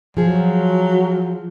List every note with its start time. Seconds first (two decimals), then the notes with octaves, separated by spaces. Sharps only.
0.17 F3 F#3 G#4